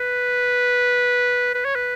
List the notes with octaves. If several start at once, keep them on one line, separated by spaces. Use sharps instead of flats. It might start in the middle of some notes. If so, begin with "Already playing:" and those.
Already playing: B4
B4
C#5
B4